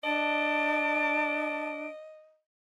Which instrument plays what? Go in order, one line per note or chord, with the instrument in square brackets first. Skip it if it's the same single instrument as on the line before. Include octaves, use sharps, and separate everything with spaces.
[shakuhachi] D4 [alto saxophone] D#5 [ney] A5 [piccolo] D7